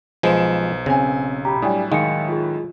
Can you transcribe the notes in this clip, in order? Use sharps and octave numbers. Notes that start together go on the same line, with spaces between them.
B1 F3 G#3 B4 C5 E7
C#3 C4 G#5
G4 A#5 B5
A2 F#3 G3 D4 E4 G5 G#5 D#6
D#3 G#3 D#4 F5 C#7
F4 G#4